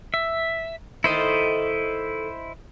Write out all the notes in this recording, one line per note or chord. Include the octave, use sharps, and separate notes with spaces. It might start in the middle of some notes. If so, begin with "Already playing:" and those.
E5
D#3 A3 E4 C5 D#5